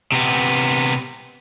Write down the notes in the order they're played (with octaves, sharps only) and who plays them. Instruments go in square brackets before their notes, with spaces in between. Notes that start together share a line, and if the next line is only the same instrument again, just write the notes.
[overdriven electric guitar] C3 B3